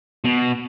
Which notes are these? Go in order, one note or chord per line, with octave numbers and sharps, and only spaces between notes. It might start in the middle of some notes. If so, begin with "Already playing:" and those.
B2